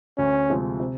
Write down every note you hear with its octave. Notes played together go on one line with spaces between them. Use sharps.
D2 C#4
C3 F3 G#3 C4
C3